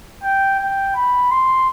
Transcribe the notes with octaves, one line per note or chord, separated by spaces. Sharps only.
G5
G5
B5
C6